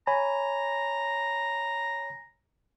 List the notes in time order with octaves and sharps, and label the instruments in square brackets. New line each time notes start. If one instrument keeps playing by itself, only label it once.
[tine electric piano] C#5 G#5 B5 [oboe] A#5